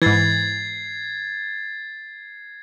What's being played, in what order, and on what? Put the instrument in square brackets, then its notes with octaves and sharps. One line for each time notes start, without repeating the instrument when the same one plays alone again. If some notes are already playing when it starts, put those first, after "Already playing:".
[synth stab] G#2 E3 [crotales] G#6 A6 C7